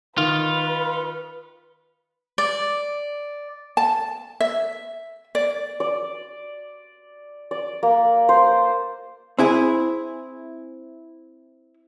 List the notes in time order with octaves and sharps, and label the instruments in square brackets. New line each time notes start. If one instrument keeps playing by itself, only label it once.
[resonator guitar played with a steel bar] D#3 [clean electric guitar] F4 [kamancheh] B4
[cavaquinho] D5
[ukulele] A5
E5
D5
[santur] D5
D5
A#3
C5
[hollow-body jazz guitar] C4 E4 G#4